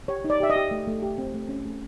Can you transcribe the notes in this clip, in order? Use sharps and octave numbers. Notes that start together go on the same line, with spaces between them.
G4 C#5
D#4
D5
G4 E5
D#5
G4
A3
A3
G4
C4
A3
C#4
A3